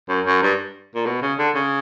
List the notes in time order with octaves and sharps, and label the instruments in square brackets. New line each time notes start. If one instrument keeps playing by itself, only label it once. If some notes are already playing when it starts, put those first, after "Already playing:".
[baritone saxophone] F#2
F#2
G2
A#2
B2
C#3
D3
C#3